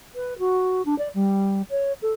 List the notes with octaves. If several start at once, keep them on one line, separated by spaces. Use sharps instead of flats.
B4
F#4
D4
D5
G3
C#5
A4